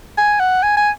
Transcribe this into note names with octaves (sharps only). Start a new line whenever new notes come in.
G#5
F#5
G#5
G#5